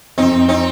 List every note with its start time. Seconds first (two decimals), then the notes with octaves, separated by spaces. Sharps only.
0.18 F2 C4 D#4
0.48 C4 D#4